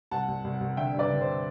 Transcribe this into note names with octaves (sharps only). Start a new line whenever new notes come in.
C2 F#5 A5
C2
C2
C2
D3 E5 G5
G2
B4 D5
D3
C5